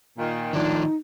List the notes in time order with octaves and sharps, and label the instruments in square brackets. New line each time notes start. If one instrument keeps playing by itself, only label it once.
[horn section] A#2 D#3
[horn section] A2 D4 [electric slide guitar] D#3 F3 [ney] D#4